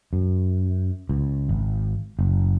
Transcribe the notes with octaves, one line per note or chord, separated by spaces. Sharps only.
F#2
C#2
G#1
F#1